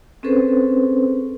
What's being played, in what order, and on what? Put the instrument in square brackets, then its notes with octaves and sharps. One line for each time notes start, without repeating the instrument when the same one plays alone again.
[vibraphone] C4 C#4 G#4 A4 B4 C5